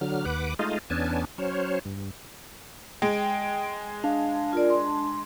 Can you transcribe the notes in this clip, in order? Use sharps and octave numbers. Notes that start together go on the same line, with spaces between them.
D3 F#3 F6
D#2 B4 F#5 D6
G#3 A3 D#4 F4 D#5 F5
E2 B3 C#4 D4 G#5 A5
F#3 C#4 C5 C#5
G2
G#3 G5
D4 F5
F4 A#4 D5
C6